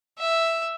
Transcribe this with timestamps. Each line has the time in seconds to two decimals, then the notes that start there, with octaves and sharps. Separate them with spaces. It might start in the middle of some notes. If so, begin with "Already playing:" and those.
0.18 E5